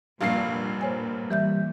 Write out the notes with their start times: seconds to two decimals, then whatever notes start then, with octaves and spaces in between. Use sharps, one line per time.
0.21 F1 G2 A#2 F5 C7
0.81 C5 C#5 G#5
1.30 E3 G3 E5 G6